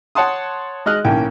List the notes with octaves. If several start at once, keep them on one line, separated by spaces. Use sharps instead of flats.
C#5 F#5 A5 C6 D#6
G#3 D#5 F6 F#6
B1 E3 A#3 C#4 G5